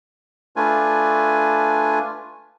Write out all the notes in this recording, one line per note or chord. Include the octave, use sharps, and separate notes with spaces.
A3 D4 F4 B4 G#5